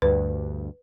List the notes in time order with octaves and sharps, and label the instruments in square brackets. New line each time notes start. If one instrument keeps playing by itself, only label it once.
[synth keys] D2 G2 [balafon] B4